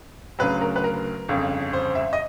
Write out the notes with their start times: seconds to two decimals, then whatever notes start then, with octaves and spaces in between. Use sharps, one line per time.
0.39 D2 C#3 F#3 B4
0.61 A#4
0.76 B4
0.84 A#4
1.28 G1 F2 C#3
1.73 C5
1.95 E5
2.13 D#5